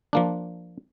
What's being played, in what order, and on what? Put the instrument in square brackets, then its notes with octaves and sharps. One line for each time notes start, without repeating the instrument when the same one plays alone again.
[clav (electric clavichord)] F3 A#3 D4